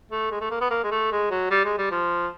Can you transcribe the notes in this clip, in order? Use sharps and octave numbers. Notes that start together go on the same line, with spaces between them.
A3
G#3
A3
A#3
B3
A#3
G#3
A3
G#3
F#3
G3
G#3
G3
F3